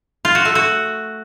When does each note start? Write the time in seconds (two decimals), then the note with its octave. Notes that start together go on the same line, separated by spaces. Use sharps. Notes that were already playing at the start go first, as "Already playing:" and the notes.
0.25 F4
0.35 F#4
0.45 A3
0.55 F#4